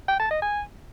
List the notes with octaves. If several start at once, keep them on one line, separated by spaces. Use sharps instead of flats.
G5
A5
D#5
G#5